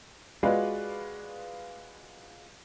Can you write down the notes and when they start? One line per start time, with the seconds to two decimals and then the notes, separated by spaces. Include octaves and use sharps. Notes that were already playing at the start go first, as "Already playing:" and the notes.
0.43 G#3 F4 F#4 B4 D5 F5